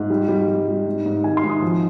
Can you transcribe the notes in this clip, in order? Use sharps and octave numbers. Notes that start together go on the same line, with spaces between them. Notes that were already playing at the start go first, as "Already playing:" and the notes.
Already playing: G#2
G3
G3
G3
G3
G#2
G#2
D#3 G#5
C6
G#2
D#6
F3